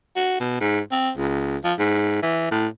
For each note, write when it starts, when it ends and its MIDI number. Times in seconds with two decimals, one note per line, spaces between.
0.16 0.36 66
0.40 0.59 47
0.60 0.80 44
0.92 1.10 60
1.17 1.57 37
1.64 1.74 53
1.79 2.19 44
2.22 2.47 52
2.51 2.68 45